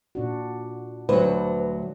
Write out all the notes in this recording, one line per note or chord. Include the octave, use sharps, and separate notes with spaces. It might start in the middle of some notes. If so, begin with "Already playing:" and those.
A#2 D4 F#4
D2 D3 F#3 D4 B4 C5